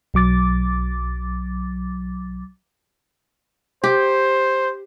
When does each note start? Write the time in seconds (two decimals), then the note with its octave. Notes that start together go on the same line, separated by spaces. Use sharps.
0.14 B1 F#3 D6 A6
3.84 G4 C5